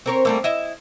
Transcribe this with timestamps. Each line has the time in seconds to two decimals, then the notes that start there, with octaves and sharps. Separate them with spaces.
0.06 C4 A#4 C#5
0.25 G3 A3 A#3
0.44 E4 D#5 E5